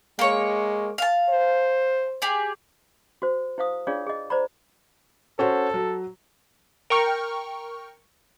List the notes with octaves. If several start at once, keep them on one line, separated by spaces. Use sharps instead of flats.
G#3 A#3 C#5
F5 A5
C5
G4 G#4
F#4 C5
E4 C5 F5 D#6
D4 F4 G#4 C#5 D5 F5
G#4 D#5
C5 D5 A#5 B5
C#4 F#4 A4 C5
F#3
A#4 G5 C#6 F6